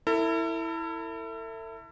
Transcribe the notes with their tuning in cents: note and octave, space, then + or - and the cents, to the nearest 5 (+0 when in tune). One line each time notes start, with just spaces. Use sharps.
E4 +0 A4 +40